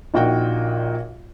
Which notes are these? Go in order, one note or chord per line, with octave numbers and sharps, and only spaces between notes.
A#1 A#2 D#4 F#4 G5